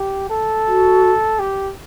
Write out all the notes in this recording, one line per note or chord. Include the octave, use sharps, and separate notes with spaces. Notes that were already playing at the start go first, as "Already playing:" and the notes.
Already playing: G4
A4
F#4
G4